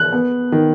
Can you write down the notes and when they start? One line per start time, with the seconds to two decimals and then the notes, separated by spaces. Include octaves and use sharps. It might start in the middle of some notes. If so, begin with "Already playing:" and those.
Already playing: F#6
0.12 B3
0.52 D#3